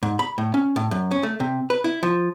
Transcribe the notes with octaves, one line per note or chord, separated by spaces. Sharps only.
G#2
B5
A2
C#4
A2
F#2
C#4
A3
C3
B4
E4
F3